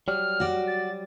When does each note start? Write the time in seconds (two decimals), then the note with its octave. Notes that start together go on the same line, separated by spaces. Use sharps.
0.08 F#3 G3 F6
0.40 F#4 D5
0.67 A6